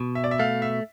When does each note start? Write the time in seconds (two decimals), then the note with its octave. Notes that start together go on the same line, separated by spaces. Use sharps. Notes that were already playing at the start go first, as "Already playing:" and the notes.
Already playing: B2
0.15 E5
0.24 D5
0.31 E5
0.39 A3 F5
0.62 E5